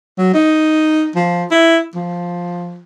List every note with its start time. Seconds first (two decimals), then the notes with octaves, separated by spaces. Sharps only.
0.18 F#3
0.34 D#4
1.16 F3
1.51 E4
1.95 F3